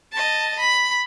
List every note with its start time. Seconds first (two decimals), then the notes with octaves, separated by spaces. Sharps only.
0.12 D#5 A5
0.60 B5